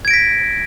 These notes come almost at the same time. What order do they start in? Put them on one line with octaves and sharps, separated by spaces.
G#6 D7 A#6 B6